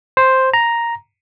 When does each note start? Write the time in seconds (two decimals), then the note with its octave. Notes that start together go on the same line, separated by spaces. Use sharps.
0.17 C5
0.54 A#5